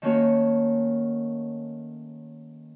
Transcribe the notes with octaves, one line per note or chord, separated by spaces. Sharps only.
D#3 A3 A#3 C#4 F#4 C#5